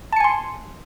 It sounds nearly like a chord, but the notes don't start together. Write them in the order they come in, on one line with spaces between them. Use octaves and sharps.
A5 C#7 G#5 C6